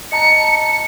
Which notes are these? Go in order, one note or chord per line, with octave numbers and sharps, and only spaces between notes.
D#5 A5 A#5 C#7